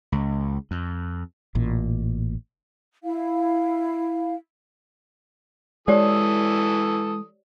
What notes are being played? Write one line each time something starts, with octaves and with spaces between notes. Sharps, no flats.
C#2
F2
A1 A#2
E4 F5
E3 G#3 G4 A4 C#5 D5 D#6